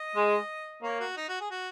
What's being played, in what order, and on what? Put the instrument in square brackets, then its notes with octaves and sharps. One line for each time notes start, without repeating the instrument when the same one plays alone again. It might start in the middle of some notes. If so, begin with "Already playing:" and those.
Already playing: [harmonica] D#5
[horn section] G#3
[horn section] A#3 [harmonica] C#5
[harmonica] F#4
D#4
F#4
G#4
F#4